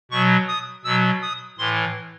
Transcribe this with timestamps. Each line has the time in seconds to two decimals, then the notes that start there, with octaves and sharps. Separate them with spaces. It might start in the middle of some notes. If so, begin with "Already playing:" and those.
0.11 B2 F#3 C#6
0.48 D#6
0.85 B2 F#3 E6
1.22 D#6
1.58 A2 E3 C6